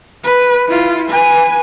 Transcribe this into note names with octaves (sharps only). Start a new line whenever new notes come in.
B4
E4 F4
B4 G#5